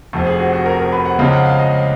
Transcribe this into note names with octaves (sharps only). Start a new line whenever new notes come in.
F1 F2 F3
G#4
F#4
F#4
A#4
A#4
B4
F#5
C#2 C#3 F3 G#3 F5
F#5
F5
D#5